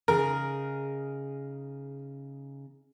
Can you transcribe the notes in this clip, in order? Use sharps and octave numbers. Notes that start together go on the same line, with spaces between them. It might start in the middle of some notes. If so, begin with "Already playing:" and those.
C#3 D#4 G#4 A#4